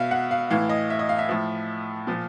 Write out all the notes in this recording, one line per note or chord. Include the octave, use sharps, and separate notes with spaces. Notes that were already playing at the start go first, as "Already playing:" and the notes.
Already playing: B2 E5 F5
F#5
F5
A2 E3 F5
D#5
E5
D#5
F5
E5
A2 F3
A#2 F3